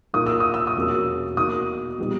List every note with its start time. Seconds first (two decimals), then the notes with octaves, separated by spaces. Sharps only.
0.14 A#2 A#3 D#4 D#6
0.26 E6
0.40 D#6
0.54 E6
0.67 D#6
0.76 E2 B2 A#3 C#4
1.37 B2 A#3 D#4 D#6
1.98 A#2 G3 B3 D#4